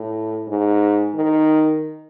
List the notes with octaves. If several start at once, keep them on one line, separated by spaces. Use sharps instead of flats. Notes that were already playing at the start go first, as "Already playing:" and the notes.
Already playing: A2
G#2
D#3